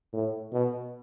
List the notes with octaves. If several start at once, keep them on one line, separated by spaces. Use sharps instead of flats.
A2
B2